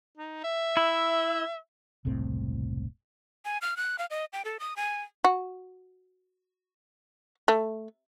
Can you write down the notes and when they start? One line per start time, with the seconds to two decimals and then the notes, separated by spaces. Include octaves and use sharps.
0.18 D#4
0.44 E5
0.77 E4
2.05 E1 C2 A2 C4
3.45 G#5
3.62 F6
3.77 F#6
3.99 F5
4.10 D#5
4.33 G5
4.45 A4
4.60 D#6
4.76 G#5
5.24 F#4
7.48 A3